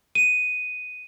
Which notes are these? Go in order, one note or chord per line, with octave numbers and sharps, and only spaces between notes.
D#7